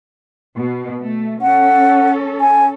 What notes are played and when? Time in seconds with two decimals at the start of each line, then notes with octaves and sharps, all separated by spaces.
0.57 B2
1.02 A3
1.42 C#4 A4 F#5
2.41 G#5